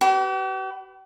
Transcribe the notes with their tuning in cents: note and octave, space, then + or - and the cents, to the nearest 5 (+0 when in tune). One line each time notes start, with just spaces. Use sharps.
G4 -45 B4 +15